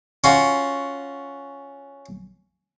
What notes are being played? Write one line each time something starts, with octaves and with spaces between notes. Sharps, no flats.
C#4 F4 F#4